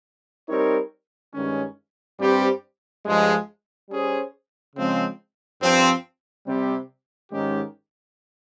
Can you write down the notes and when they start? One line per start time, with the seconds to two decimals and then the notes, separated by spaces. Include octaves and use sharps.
0.49 G3 C4 D#4 A#4 C#5
1.34 G2 D#3 G#3 C#4
2.19 G2 G3 C4 G4 C5
3.05 G2 F3 G#3
3.90 G3 C#4 G#4 C5
4.75 C#3 F3 G#3 C4
5.61 G2 F3 C4
6.47 C3 G3 C4 G4
7.32 G#2 D#3 G#3 C#4 G4